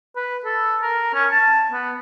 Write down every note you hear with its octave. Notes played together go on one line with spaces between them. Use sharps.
B4
A4
A#4
C#4
A5
B3